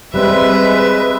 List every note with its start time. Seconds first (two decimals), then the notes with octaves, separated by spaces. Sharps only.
0.14 G3 G#3 C4 B4 E5